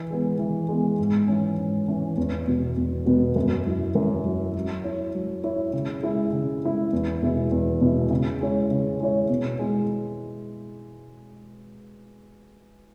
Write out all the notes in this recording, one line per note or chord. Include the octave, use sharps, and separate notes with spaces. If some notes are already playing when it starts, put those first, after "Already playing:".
Already playing: E3
G#3 B3
E3
G#3 B3
G#2
E3 C#4
G#2
E3 C#4
E2
B2 B3 F#4
E2
B2 B3 F#4
F#2
F#3 E4
F#2
F#3 E4
F#3
E4 C#5
F#3
E4 C#5
C#3
G#3 E4
C#3
G#3 E4
E2
B2 G#3 E4
E2
B2 G#3 E4
C#3
G#3 E4 C#5
C#3
G#3 E4 C#5
B2
G#3 E4